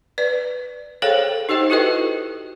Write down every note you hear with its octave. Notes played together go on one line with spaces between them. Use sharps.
B4 D5
G#4 A4 C5 C#5 F5 G5
D#4 G4 C5 D#5 G5
E4 F#4 A4 B4 D#5 G5